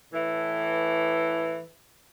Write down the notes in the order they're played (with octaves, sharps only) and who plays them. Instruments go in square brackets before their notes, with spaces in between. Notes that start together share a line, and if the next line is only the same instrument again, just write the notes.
[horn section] A2 E3